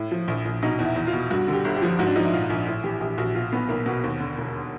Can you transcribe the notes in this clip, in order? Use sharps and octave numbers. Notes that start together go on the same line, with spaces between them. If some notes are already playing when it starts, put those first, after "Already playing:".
Already playing: A2
F3
A#1
A#1
B2 D#4
E2
E4
E2
F4
B2
G2 F#4
D3 G4
G1
G4
F3
G#2 F#4
D4
F3 D#4
E4
A#1 F4
A#1
A2
E3 G4
A#1 G4
A#1 F#4
B2 F4
B1 B3
B1 A#3
B2 B3
D#2
D3
E1